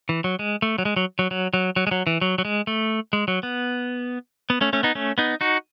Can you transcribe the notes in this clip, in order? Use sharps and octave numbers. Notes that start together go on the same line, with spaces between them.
E3
F#3
G#3
A3
F#3
G#3
F#3
F#3
F#3
F#3
F#3
G#3
F#3
E3
F#3
F#3
G#3
A3
G#3
F#3
B3
B3
A3 C#4
A3 C#4
B3 D#4
A3 C#4
B3 D#4
D#4 F#4